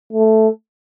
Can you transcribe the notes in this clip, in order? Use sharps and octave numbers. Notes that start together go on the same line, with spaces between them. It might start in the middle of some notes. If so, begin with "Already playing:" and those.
A3